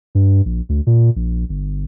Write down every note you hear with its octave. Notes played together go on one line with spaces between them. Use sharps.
G2
A#1
D2
A#2
A#1
G1